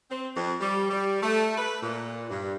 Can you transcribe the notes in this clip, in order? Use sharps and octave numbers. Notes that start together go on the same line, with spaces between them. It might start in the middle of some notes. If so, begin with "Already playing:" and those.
C4
F2
G3
G3
A3
B4
A#2
G2